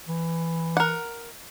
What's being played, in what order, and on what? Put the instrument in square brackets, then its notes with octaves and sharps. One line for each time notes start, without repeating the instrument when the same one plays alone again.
[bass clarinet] E3
[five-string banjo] A#4 F#5